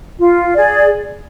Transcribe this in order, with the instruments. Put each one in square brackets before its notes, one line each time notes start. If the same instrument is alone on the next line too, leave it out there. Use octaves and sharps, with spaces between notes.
[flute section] F4
G#4 D5